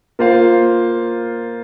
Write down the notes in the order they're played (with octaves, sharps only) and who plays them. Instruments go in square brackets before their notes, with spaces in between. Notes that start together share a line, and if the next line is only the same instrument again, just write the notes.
[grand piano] A#3 F4 C5 F5